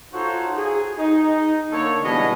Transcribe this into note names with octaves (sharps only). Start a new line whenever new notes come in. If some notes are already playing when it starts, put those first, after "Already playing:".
D#4 F4 F#4 A4 C5 C#5
G#4
D#4
D3 A#3 A4 C#5
B2 E3 G3 G#3 D#5